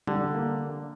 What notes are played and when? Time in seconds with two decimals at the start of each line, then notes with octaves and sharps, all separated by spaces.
0.07 D3 G3
0.34 A#3